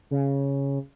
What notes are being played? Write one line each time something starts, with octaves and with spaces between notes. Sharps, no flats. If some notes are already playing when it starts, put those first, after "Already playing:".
C#3